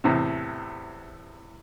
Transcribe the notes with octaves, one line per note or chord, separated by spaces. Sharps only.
E2 A2 C3